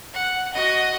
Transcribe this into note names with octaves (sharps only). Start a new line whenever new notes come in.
F#5
F#4 D#5